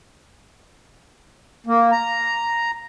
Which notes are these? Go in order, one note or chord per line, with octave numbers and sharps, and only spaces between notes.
A#3
A#5